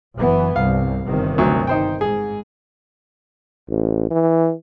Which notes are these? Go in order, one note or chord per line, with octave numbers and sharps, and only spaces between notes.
F#1 E3 B3
C2 G2 F5
G1 C3 D#3
D2 F#3 C#6
D#4 C5 G5
G#2 G#4
A1
E3